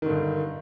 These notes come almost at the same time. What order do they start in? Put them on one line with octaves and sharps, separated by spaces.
D#3 D3 G2